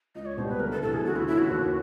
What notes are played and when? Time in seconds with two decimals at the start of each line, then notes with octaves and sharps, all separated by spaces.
0.15 C#2 D#5
0.26 C#5
0.37 B2 G3 C5
0.49 B4
0.60 D2 A#4
0.72 A4
0.82 C3 E3 A4
0.93 G#4
1.04 D2 F#4
1.16 E4
1.28 C#3 E3 E4
1.39 F#4
1.50 D#2